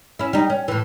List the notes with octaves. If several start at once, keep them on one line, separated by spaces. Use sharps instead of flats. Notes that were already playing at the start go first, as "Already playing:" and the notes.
C#4 E4
G3 D#4
C#4
A2 E3